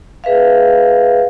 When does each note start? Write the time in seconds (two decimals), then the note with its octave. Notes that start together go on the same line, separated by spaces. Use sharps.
0.24 G#4 B4 E5 F5